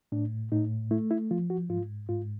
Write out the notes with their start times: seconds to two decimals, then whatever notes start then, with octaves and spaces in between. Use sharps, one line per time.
0.12 A2 D4
0.52 A2 D#4
0.91 A3 E4
1.11 E4
1.31 F3 F4
1.50 F#4
1.69 G#2 F4
2.09 G#2 F4